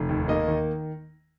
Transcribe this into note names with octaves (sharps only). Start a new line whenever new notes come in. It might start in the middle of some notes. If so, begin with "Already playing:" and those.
Already playing: F1
D#2
A#3 D#5
D#3